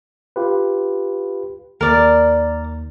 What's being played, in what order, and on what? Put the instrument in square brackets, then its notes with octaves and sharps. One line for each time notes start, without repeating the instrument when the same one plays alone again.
[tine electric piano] F4 G4 B4
[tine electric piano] D#2 [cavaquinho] A#4 D5